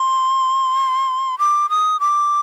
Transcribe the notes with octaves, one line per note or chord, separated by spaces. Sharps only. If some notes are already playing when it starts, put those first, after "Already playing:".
Already playing: C6
D6
D#6
D6